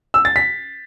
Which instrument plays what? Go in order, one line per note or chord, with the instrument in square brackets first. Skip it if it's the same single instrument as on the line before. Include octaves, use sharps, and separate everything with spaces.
[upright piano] E6
A6
B6